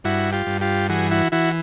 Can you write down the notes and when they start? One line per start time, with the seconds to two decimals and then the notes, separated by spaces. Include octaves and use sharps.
0.04 G2 E4 F#4
0.32 F4 G4
0.47 G2
0.61 F4 G4
0.89 E3 F#4 G#4
1.11 E4 F#4
1.32 E3 E4 F#4